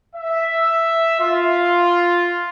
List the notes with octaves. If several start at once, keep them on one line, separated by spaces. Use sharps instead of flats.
E5
F4